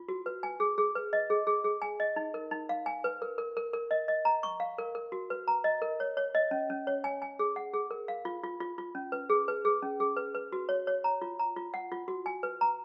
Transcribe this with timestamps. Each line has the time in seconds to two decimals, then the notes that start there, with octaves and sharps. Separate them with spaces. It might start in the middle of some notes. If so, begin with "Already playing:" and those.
Already playing: F4
0.09 F#4
0.26 B4
0.43 G#5
0.60 G#4
0.78 G#4
0.95 B4
1.13 D#5
1.30 G#4
1.47 G#4
1.64 G#4
1.82 G#5
2.00 D#5
2.16 D#4
2.34 A#4
2.51 D#4
2.69 F5
2.86 G#5
3.04 B4
3.22 A#4
3.38 A#4
3.57 A#4
3.73 A#4
3.91 D#5
4.08 D#5
4.25 A#5
4.43 C#6
4.60 F5
4.78 A#4
4.95 A#4
5.12 F#4
5.30 B4
5.48 A#5
5.64 D#5
5.82 A#4
6.00 C#5
6.17 C#5
6.35 D#5
6.51 C#4
6.70 C#4
6.87 C#5
7.04 G#5
7.22 G#5
7.39 G#4
7.56 F#5
7.73 G#4
7.91 A#4
8.08 F5
8.25 F4
8.43 F4
8.60 F4
8.78 F4
8.95 C#4
9.12 B4
9.30 G#4
9.48 B4
9.65 G#4
9.82 C#4
10.00 G#4
10.16 B4
10.35 B4
10.52 F#4
10.69 C#5
10.87 C#5
11.04 A#5
11.22 F4
11.39 A#5
11.56 F4
11.74 F#5
11.92 F4
12.08 F#4
12.26 G#5
12.43 B4
12.61 A#5